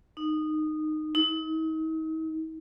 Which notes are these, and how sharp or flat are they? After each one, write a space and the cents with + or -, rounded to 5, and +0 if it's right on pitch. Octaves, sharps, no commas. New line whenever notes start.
D#4 -15
D#4 +40